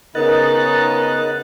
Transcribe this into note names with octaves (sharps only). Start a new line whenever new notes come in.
C#3 B3 D#4 A#4 D#5 F#6 A6